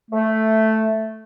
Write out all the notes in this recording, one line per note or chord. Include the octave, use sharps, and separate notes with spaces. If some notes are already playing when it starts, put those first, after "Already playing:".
A3